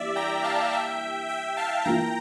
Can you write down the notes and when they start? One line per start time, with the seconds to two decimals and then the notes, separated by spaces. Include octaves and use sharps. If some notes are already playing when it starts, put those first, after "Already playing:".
Already playing: E3 G3 A#3 D4 G4 D5 E5
0.16 G5 A#5
0.44 F5 A5
0.72 E5 G5
1.29 E5 G5
1.57 F5 A5
1.85 E3 A#3 F4 G5 A#5